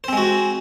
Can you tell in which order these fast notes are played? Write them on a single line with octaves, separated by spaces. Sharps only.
C5 C4 G#3 F#4